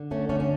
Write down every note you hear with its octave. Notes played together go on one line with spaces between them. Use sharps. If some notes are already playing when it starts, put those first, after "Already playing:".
Already playing: D3
A3 C#4
D3 A3 C#4
C#4